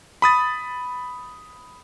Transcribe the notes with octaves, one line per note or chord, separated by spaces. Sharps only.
B5 D#6 A6